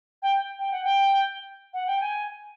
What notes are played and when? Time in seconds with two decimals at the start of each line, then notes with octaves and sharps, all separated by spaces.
0.22 G5
0.59 G5
0.71 F#5
0.84 G5
1.74 F#5
1.87 G5
2.00 G#5